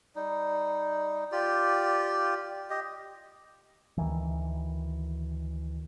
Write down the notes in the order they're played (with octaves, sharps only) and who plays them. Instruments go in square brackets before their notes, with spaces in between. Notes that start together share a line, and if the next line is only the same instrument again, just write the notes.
[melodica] G3 D#4
F4 G4 D5
G4 D#5
[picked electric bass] D2 D#3 E3